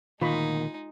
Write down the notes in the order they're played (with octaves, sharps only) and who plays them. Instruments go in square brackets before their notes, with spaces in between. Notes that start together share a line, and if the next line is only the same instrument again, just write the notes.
[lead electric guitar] D2 A#2 [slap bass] D#3 [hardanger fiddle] G#3 D#4 [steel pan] F4 B5 C#6